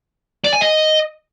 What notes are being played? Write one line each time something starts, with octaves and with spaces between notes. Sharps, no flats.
D5
G#5
D#5